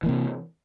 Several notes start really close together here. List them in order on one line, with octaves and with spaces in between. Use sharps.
E3 A#3 C3